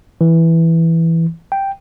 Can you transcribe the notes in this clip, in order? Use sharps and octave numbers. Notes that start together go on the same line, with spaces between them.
E3
G5